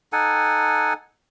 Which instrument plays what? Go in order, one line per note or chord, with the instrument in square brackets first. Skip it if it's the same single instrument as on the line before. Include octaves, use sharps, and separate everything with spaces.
[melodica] D#4 A4 F#5 G#5